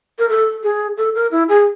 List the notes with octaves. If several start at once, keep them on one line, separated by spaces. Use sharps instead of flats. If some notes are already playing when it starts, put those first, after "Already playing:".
A#4
A4
G#4
A4
A#4
E4
G#4